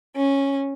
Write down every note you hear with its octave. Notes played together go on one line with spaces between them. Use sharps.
C#4